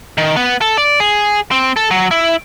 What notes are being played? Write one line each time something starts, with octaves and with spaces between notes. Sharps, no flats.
D#3
B3
A4
D5
G#4
C4
A4
F#3
E4